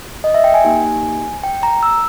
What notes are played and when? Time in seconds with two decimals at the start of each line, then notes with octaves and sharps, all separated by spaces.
0.24 D#5
0.34 E5
0.44 G5
0.54 G#5
0.64 A#3 D#4 G4
1.43 G5
1.63 A#5
1.83 E6